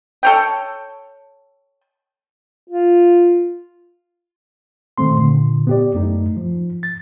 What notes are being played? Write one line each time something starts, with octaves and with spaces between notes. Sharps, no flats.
A4 C#5 G5
F4
A#2 D#3 A3 C4 C6
A#2 D3
B3 G4 D5
F#2 A3 D#4
F3
A6